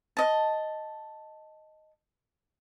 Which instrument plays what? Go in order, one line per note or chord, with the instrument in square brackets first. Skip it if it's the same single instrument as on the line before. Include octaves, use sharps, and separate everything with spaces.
[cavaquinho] D#5 A5